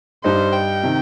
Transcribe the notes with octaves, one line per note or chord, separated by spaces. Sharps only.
G2 G3 D#4 C5
G5
C3 D#3